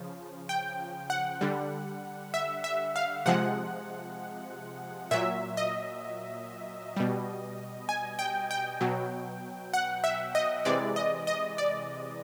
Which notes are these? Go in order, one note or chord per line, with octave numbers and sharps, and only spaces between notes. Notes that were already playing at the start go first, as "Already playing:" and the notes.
Already playing: C#3 F3
G5
F#5
D3 G3
E5
E5
F5
C3 F3 G#3 F#5
A#2 F#3 E5
D#5
B2 G3
G#5
G5
G5
B2 F#3
F#5
E5
D#5
C3 E3 G#3 D5
D#5
D#5
D5